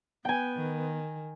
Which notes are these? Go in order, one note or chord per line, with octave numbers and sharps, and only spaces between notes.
B3 G5 G#5
D#3